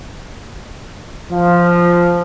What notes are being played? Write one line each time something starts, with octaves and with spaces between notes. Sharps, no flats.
F3